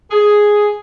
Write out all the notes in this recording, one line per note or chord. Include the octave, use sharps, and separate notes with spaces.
G#4